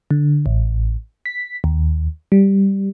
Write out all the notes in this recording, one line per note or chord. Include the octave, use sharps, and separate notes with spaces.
D3
A1
B6
D#2
G3